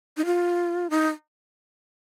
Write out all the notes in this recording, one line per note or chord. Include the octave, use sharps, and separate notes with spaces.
D#4
F4
D#4